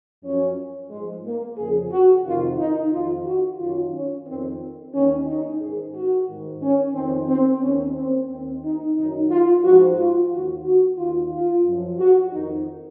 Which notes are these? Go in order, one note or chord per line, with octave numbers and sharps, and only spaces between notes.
F#2 F3 C#4
G#2 F3 G#3
A#3
F2 C#3 F3 G#4
F#4
F2 C3 D#3 F4
D#4
F2 D#3 F4
F#4
F#2 D#3 F4
C#4
F2 D#3 C4
D#2 D#3 C#4
D#4
G#2 D#3 G#4
F#4
G#2 D#3
C#4
F2 D#3 C4
C4
D#2 D#3 C#4
C4
D#2 D#3 C4
D#4
F#2 D#3 D#4
F4
G#2 F3 F#4
F4
D#2 D#3 F#4
F#4
D#2 D#3 F4
F4
F#2 F3
F#4
F2 D#3 D#4